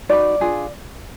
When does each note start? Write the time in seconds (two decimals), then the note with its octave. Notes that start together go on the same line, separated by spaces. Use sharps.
0.09 D#4 F#4 B4 D5
0.40 D4 F4 G#4